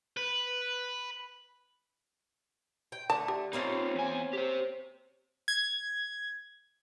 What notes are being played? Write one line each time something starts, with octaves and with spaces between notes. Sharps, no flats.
B4
G5
D3 A3 A5
G4
A#3 C4 C#4 D#4 F4
E2 G#5
G4 C5
G#6